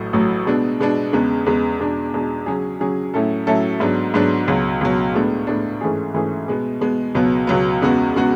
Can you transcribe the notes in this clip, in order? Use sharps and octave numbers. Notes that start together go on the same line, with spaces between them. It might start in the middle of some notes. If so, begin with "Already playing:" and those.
Already playing: A1 A2 F#3
A1 A2 F#3
B2 G#3 B3 D4
B2 G#3 B3 D4
E2 C#3 G#3 B3
E2 C#3 G#3 B3
E2 B2 G#3 D4
E2 B2 G#3 D4
C#3 F#3 C#4 G#4
C#3 F#3 C#4 G#4
A2 F#3 C#4 E4 A4
A2 F#3 C#4 E4 A4
G#2 F#3 B3 D4
G#2 F#3 B3 D4
C#2 B2 F#3
C#2 B2 F#3
A2 G#3 B3 D4
A2 G#3 B3 D4
G#2 E3 A3 C#4 G#4
G#2 E3 A3 C#4 G#4
B2 G#3 B3
B2 G#3 B3
C#2 B2 F#3 B3
C#2 B2 F#3 B3
E2 C#3 G#3 B3 F#4
C#3 G#3 B3 F#4